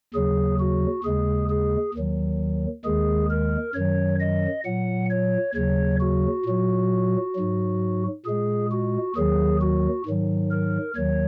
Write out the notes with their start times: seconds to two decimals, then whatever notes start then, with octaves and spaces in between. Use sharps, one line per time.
0.14 D#2 C#3 F#3 G#4
0.59 F#4
1.04 D#2 C#3 G#3 G#4
1.50 G#4
1.94 D#2 D#3 F#3
2.85 D#2 D#3 G#3 G#4
3.30 A#4
3.75 F#2 D#3 F#3 C#5
4.20 D#5
4.65 A#2 F#3 F#5
5.10 C#5
5.55 D#2 C#3 F#3 C#5
6.00 F#4
6.45 A#2 F#3
7.35 G#2 F#3
8.25 A#2 G#3 G#4
8.71 F#4
9.16 D#2 D#3 F#3 G#4
9.61 F#4
10.06 G#2 D#3 F#3
10.51 A#4
10.96 D#2 D#3 F#3 C#5